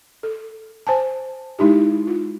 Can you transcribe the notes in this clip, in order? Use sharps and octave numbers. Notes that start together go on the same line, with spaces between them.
A4
C5 G#5 A5
G#3 D#4 E4 G4
F4